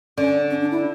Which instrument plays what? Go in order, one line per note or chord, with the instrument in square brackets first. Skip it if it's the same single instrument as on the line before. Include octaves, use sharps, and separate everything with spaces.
[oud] D3 [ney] C#4
[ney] C#4
D4
E4